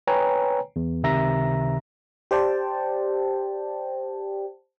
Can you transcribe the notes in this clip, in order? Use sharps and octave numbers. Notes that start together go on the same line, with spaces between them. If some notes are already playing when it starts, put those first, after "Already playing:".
B4 C#5 G5 G#5 A#5
E2
C#2 C3 D#3 E5 A#5 A#6
G4 C5 D5 G5 A5